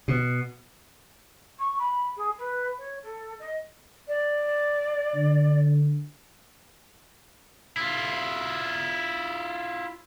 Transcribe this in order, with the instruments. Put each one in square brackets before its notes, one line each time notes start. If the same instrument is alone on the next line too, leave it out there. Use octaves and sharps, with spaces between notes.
[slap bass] B2
[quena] C#6
B5
G#4
B4
C#5
A4
D#5
D5
[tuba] D3
[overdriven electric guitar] E4 F4